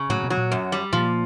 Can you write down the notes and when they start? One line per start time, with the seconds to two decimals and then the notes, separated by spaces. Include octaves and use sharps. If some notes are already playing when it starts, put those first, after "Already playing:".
Already playing: C#3
0.09 A2 F#3 A3
0.23 B2 B3
0.30 F#3
0.37 A#2 A#3
0.52 F#2
0.72 G3
0.93 A#2 F3 A#3